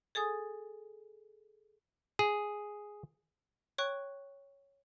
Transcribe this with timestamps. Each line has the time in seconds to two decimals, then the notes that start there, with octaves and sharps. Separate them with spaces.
0.15 G#4 A4 G#5 D#6
2.19 G#4
3.78 C#5 G5 C#6 F#6